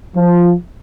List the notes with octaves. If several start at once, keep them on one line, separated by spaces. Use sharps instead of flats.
F3